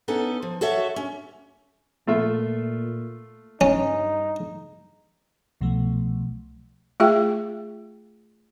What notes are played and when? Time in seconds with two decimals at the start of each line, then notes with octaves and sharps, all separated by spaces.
0.08 B3 C#4 D#4 A4
0.42 F3
0.61 F#4 A4 C#5 E5
0.96 C#4
2.07 A#2 A3 F4 E5
3.61 G2 C#4 D#4
5.61 C2 B2 F3 F#3 A3
7.00 A3 F4 G#4 E5 G5